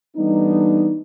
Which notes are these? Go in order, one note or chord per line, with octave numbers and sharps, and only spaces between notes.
E3 G3 A3 B3 D4 D#4